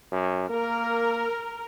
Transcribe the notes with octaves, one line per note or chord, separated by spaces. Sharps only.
F#2
A#3 A#4